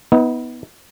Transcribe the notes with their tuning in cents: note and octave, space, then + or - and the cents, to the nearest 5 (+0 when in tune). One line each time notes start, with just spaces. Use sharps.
B3 +0 D#4 +35